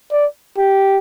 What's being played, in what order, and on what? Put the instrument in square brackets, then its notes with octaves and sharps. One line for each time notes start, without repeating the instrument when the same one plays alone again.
[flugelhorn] D5
G4